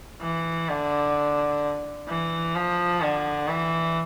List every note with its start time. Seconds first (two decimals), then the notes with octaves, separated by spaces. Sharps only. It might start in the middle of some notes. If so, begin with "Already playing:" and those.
0.21 E3
0.69 D3
2.08 E3
2.55 F3
3.01 D3
3.47 E3